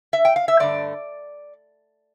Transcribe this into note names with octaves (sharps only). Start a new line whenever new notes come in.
E5
G5
F5
E5
G2 D3 F3 A3 D5